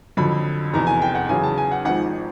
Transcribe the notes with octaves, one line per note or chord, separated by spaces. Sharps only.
F2 D3 F#3 B5
F1 E2 B2 A#5
G#5
G5
F#5
E2 C#3 F#3 G#5
A5
G#5
F#5
G#1 G#2 F3 F#5